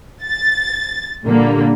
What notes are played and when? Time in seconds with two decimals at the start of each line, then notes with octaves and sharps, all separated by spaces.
0.23 A6
1.25 A#2 D3 G3 A#3